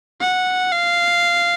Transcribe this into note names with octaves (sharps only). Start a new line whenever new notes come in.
F#5
F5